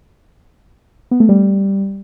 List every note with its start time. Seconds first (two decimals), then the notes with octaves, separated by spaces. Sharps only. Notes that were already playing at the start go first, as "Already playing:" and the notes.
1.11 B3
1.20 A3
1.29 G3